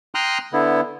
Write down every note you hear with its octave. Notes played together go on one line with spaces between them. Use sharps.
G5 A#5 C6 D#6 F6 F#6
D3 B3 E4